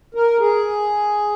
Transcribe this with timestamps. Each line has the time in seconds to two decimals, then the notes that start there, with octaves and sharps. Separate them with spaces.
0.15 A#4
0.39 G#4